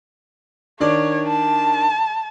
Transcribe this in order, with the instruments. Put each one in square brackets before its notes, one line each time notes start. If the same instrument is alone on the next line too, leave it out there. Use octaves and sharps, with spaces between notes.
[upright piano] D#3 D4 D5 [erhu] C#5
[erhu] A5